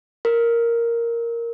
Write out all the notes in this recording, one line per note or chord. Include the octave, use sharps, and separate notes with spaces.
A#4